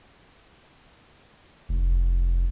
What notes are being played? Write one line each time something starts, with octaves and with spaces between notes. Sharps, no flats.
F1